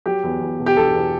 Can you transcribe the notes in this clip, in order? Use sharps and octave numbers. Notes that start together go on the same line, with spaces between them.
F#3 G4
E2
E2
B2
G4
E2 A4
E2